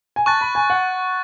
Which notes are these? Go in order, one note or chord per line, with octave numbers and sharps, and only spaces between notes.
G#5
A5 C#6 F#6 A6
B5
G#5
F#5